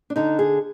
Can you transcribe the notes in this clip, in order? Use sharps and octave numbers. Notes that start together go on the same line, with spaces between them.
D4
D3 D#4
G#4